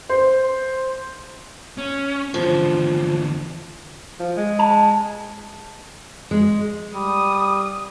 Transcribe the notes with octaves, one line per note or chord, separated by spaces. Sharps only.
C5
C#4
E2 D3 F3
F3
G#3
A5
G#3
G3 D#6